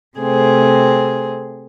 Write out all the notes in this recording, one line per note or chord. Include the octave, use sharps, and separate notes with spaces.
C3 A3 C4 G#4